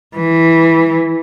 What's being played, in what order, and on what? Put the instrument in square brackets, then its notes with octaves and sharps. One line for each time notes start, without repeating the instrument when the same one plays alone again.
[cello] E3